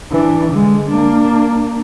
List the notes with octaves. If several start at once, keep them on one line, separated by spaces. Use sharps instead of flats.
E3 D4
D3 G#3
A#3 D4